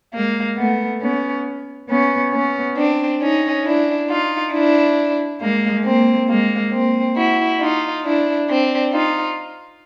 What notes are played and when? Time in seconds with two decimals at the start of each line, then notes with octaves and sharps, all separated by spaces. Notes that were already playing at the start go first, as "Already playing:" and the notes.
0.13 G#3 A#3
0.57 A3 B3
1.01 B3 C#4
1.89 B3 C#4
2.33 B3 C#4
2.77 C4 D4
3.21 C#4 D#4
3.65 D4 E4
4.09 D#4 F4
4.52 D4 E4
5.40 G#3 A#3
5.84 A#3 C4
6.28 G#3 A#3
6.72 A#3 C4
7.16 E4 F#4
7.61 D#4 F4
8.04 D4 E4
8.48 C4 D4
8.93 D#4 F4